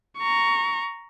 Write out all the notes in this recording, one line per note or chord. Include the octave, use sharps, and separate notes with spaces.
A#5 C#6